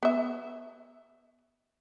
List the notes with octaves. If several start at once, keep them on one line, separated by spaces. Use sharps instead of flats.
B3 E5